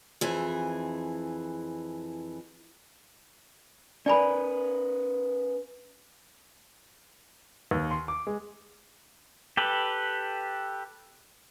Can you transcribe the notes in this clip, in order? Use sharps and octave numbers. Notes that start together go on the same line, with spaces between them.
F2 E3 G#4
C#4 A#4 B4 D5 G#5 B5
D#2
C6
D6
G#3
G4 A4 B4